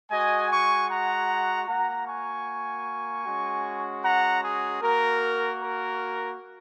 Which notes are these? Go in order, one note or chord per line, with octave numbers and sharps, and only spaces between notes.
G#3 F#4 D#5 G#5
G#5 C#6
F#5 A#5
A#3 F#4 F#5 A#5
G#5 C#6
G#3 C#4 F#4
F#5 A#5
G#4
A#3 F#4 A#4
A#4